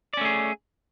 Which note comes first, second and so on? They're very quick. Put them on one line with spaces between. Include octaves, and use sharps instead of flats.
D5 C#4 A3 G#4